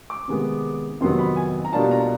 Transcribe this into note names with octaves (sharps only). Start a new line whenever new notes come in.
D6
C3 D#3 G#3 B3
F2 C3 D#3 F#3 B3 C6
B5
G#5
A#5
B2 G3 A#3 D4 F4 A5
A5
A#5